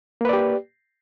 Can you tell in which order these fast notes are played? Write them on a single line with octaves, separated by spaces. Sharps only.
A#3 B4 D5 G4